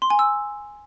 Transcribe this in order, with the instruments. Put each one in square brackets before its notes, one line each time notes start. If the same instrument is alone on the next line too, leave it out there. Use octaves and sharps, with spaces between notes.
[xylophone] C6
G#5
E6